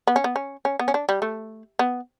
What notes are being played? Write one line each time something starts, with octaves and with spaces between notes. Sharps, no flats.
B3
C#4
B3
C#4
C#4
B3
C#4
D4
G3
A3
B3